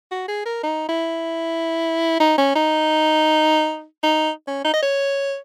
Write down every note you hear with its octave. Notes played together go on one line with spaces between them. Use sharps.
F#4
G#4
A#4
D#4
E4
D#4
C#4
D#4
D#4
C#4
D#4
D#5
C#5